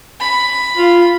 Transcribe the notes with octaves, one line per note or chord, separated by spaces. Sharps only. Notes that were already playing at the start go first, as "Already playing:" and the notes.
B5
F4